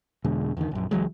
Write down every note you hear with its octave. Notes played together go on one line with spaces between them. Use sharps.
E2 B2 D3 G#3
E2 D3 D#3
A#1 F#2
C#2 E3 F#3 G#3